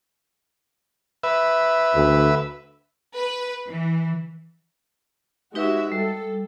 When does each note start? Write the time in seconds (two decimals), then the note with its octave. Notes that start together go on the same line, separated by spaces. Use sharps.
1.23 B4 E5
1.94 D2
3.16 B4
3.66 E3
5.55 G#3 D#4 F#4 G4 B4 E5
5.92 G3 A4